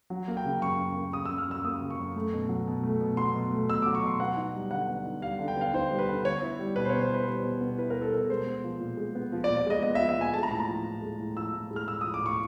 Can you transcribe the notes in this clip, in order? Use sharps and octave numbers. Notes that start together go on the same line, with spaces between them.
F#3
A#3
G5
C#3
F#2 C#6
F#3
A#3
C#3 D#6
F#2 E6
F6
F#3 E6
A#3 D#6
C#3
C#6
F#2
A3
B2
F#3
B2
A3
B2
F#3 C6
B2
A3
B2 E6
F#3 D6
C#6
B2 C6
B3 F#5
D#4
G3
D3 F#5
B3
D#4
G3 F5
D3
G5
B3 F5
D#4 C5
G3
B4
D3
B3 C#5
E4
G3
B2 B4
C5
B3 C#5
C5
E4 B4
G3 C5
B2
B3
E4 B4
A#4
G3
A4
B2 A#4
G#3 C5
B3
F3
A#2
G#3
B3
F3
D5
A#2
D5
G#3 D#5
B3 D#5
E5
F3
E5
A#2 G#5
G#3 A5
A#5
A2 A5
A#5
F3
A2
G#3
A2
F3 E6
A2
G#3
F6
A2 E6
F3 D#6
D6
A2 C#6